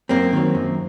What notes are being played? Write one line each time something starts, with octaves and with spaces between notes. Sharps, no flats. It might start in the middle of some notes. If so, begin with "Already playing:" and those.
F#2 A#3 C4
D#3 F#3
F#2